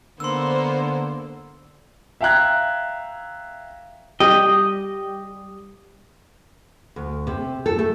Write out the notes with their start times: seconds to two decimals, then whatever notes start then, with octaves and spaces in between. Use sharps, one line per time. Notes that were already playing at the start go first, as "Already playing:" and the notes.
0.20 D3 A#3 B3 C5 C6 E6
2.21 E5 F5 G5 A#5 F#6 G#6
4.20 G3 G4 D#5
6.96 D2
7.27 C3
7.66 A4
7.79 A3